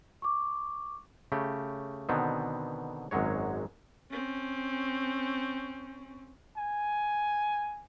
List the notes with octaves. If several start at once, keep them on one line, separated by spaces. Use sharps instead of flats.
C#6 D6
C#3 A3 G4
B2 D3 D#3 B3 C4
G#1 F#2 F#3 G#3 C#5
C4 C#4
G#5